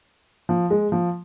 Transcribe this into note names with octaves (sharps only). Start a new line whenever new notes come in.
F3
G#3
F3